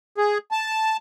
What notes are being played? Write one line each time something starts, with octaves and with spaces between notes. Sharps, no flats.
G#4
A5